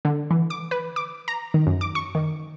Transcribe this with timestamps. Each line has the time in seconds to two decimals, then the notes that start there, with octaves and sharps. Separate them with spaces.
0.05 D3
0.31 E3
0.50 D6
0.71 B4
0.96 D6
1.28 A#5
1.54 D#3
1.67 F#2
1.81 D6
1.95 C#6
2.15 D#3